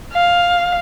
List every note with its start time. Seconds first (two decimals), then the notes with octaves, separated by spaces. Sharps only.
0.13 F5